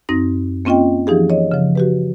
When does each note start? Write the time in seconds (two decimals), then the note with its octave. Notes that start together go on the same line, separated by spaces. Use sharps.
0.09 F#2 C4 D#4 A#6
0.65 A#3 C4 C#4 F4 D#5 G5
1.07 E3 F3 D#4 G4 G#4
1.30 C#5 D#5
1.52 C#3 F3
1.75 F#4 G4 B4